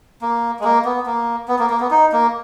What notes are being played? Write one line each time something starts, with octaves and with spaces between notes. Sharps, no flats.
A#3
G#3
A#3
B3
A#3
B3
A#3
A#3
B3
D#4
A#3